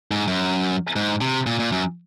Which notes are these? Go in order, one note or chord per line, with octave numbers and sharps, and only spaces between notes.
G#2
F#2
G#2
C3
A#2
A#2
F#2